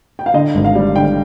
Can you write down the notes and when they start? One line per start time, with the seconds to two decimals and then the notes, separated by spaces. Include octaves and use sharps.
0.19 G5
0.26 F5
0.34 D3 D#5
0.55 G#1
0.65 F5
0.75 G3
0.95 D3 G5